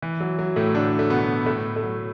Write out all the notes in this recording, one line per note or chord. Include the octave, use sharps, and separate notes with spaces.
E3
F#3
F#3
A2 A3
D3 D4
A3
B2 B3
A2 A3
A3
F#3